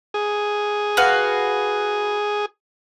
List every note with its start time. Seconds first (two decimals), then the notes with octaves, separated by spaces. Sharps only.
0.14 G#4
0.97 F#4 B4 F5